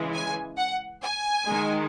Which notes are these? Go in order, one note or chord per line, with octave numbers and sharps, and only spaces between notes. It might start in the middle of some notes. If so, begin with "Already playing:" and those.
Already playing: C#3 E3 G#3
G#5
F#5
G#5
D#3 G#3